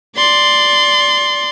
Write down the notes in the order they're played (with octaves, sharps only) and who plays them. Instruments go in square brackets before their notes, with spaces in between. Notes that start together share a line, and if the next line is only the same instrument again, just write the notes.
[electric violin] D5 C6